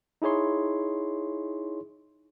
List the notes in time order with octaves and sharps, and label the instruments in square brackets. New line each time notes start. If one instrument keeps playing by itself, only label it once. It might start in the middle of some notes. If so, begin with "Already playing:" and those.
[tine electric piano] D#4 E4 G#4 C#5 C6